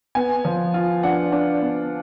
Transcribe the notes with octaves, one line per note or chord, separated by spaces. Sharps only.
B3 G#5
F3
F4
D4 F#5
D4
B3